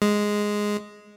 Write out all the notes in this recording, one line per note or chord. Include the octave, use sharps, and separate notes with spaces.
G#3